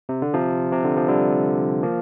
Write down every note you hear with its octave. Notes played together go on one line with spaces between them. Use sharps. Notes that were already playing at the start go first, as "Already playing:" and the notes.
C3
D3
C3 F3
C3
D3
F3
D3 G3
F3 A#3